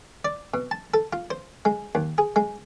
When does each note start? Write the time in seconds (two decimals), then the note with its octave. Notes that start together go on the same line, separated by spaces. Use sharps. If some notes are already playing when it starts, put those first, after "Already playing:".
0.25 D5
0.54 B2
0.71 A5
0.94 A4
1.13 F4
1.30 C5
1.65 G#3
1.95 D#2
2.18 G#4
2.36 G#3